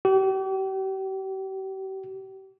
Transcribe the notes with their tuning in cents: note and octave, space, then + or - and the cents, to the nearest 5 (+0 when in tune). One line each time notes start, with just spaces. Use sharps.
G4 -40